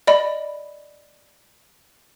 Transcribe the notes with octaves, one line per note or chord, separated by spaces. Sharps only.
D5 D#5 B5